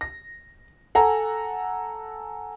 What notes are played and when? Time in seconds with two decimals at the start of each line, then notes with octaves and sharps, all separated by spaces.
0.01 A#6
0.95 A4 F#5 G#5 A#5